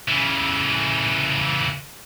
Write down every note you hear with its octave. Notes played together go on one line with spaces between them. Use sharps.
C#3 E3